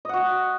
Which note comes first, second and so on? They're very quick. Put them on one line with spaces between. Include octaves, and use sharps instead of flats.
D#5 F#5 F#4